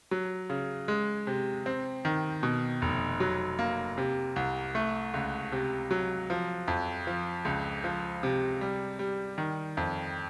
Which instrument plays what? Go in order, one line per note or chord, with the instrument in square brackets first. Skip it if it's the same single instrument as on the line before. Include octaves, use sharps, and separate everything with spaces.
[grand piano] F#3
C#3
G#3
C3
C4
D#3
B2
F1
F#3
A#3
C3
C2
A3
C#2
C3
F#3
F3
F2
F3
C#2
F3
C3
G3
G3
D#3
F2